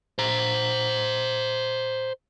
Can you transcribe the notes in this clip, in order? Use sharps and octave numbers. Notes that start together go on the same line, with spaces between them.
C5 A#5